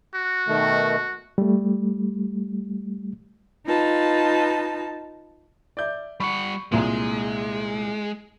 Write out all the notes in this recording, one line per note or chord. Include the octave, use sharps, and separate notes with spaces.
F#4
B2 D#3 A3
G3 A3
D#4 F4 B4 A5
D5 E5 G6
G3 F#5 B5 C#6
C2 A#2 G#3